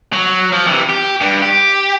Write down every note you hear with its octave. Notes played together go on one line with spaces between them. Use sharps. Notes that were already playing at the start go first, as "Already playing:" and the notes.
F#3
F3
C3 E3
G4
G2
G4